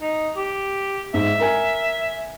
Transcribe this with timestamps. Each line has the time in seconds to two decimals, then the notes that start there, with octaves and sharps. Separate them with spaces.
0.01 D#4
0.36 G4
1.14 G#2 E5
1.40 A#4 G#5